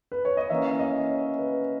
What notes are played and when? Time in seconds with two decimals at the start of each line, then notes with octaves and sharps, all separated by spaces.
0.12 B4
0.25 C#5
0.37 D#5
0.50 E3 A#3 C#4 E5
0.79 D#5
1.09 C#5
1.39 B4